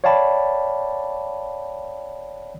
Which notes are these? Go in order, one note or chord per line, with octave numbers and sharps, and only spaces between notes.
C#5 D5 F5 G5 A5 B5